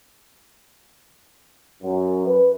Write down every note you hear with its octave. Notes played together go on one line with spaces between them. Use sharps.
F#2
B4